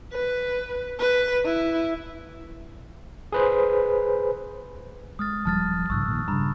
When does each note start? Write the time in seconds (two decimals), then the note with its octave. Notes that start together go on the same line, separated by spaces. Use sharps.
0.12 B4
0.99 B4
1.45 E4
3.32 G#4 B4 C5
5.19 G#3 D#6 F6 A6
5.45 D#1 F3 G3 A5 F6 A6
5.90 A#1 G#2 C#3 C#6 E6 F#6
6.08 A#2 D#3
6.28 G2 C#3 A#5 B5